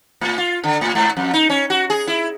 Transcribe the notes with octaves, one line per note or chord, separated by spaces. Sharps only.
A2
F4
D3
A2
G#2
F2
D#4
C#4
F#4
G#4
E4